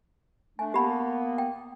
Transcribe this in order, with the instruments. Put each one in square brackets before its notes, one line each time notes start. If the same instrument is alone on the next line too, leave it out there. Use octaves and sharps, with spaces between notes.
[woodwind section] A3 D4 [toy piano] G#5
[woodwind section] A#3 B3 [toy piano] G4 A5 B5
[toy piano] G5